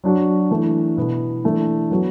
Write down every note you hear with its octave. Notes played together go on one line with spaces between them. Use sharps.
F#3 D4 F#4
E3 A3 D4
B2 B3 E4
E3 A3 D4
F#3 B3 F#4